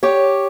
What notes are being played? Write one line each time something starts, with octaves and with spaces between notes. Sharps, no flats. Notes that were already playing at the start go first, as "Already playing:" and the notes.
G4 C#5